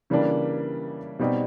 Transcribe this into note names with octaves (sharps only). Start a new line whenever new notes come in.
C#3 E3 G3 A#3 D4
B2 G3 C4 D#4